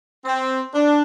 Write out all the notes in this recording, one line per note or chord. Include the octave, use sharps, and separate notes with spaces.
C4
D4